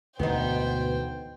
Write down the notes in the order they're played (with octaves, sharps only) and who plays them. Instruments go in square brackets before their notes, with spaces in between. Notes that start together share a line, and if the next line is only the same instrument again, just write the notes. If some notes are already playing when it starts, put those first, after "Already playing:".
[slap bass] D2 G#2 E3 [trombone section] B2 [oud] B3 D#4 [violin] C5 G5